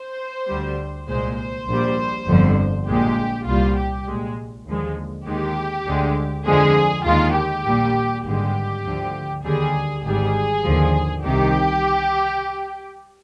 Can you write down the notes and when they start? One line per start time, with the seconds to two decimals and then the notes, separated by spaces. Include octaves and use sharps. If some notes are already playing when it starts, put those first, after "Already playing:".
Already playing: C5
0.49 D2 D3 G3
1.08 C2 A#2 G#3 C5
1.38 C5
1.69 A#1 A#2 G3
2.28 G1 F2 D3 F3
2.88 A#1 A#2 G#3 G4
3.47 C2 A#2 G3 F4
3.78 G4
4.07 A#1 A#2 G#3
4.67 D#2 D3 F3 G#3
5.27 D#2 D#3 G#3 G4
5.86 D2 D3 G#3
6.46 F2 D3 F3 G#3 G#4
7.06 D#2 D#3 G#3 F4
7.36 G4
7.65 A#1 A#2 G3
8.25 G#1 G2 D3 G#3 G4
8.85 D2 D3 F3
9.44 D#2 D3 G3 G#4
10.04 G#1 G#2 G3 G#4
10.64 D#2 D3 F3
11.23 C2 C3 D#3 G4